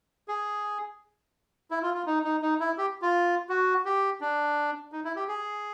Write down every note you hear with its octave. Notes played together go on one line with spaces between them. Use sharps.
G#4
E4
F4
F4
D#4
D#4
D#4
E4
G4
F4
F#4
G4
D4
D#4
E4
G4
G#4